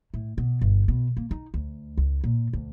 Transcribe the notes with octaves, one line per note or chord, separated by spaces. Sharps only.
A2
B2
G1
B2
A#3
D#4
D2
C#2
A#2
D2